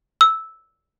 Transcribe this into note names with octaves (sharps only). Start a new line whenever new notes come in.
E6